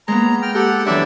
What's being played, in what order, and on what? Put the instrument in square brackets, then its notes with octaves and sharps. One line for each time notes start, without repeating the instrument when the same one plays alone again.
[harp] G#3 A#3 B3 [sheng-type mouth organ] A#5
[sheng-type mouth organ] G5 F6
[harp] G4 [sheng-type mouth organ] A4 F#5
[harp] F#2 E3 [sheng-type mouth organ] D4 D5 E5